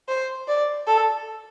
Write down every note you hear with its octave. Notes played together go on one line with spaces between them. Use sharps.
C5
D5
A4